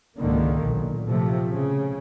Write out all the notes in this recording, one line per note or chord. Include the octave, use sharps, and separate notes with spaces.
C#2 G#2 D3 D#3 A#3
B1 A#2
C3 F3 A3
C#3